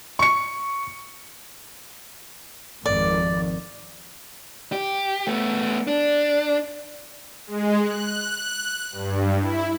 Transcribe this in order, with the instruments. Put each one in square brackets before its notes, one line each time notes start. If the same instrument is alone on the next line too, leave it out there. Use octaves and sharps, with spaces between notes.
[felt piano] C#6 C#7
[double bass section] G#1 F2 D#3 [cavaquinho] D5
[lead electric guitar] G4
A3 B3
D4
[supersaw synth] G#3
F#6
G2
E4